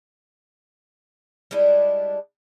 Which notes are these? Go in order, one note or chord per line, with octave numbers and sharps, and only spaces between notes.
G3 G#3 D4 E4